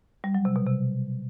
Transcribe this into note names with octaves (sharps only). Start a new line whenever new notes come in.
G3
F#3
C3
B2
C3